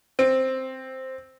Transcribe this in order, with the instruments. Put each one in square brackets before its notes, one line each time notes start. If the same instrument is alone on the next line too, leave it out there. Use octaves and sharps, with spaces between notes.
[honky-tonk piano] C4